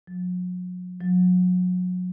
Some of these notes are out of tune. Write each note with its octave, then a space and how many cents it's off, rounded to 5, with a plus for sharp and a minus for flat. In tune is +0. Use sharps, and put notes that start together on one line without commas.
F#3 -40
F#3 -35